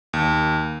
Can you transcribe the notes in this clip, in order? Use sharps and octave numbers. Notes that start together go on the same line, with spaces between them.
D#2